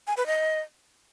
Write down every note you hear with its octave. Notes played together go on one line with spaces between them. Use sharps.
G#5
B4
D#5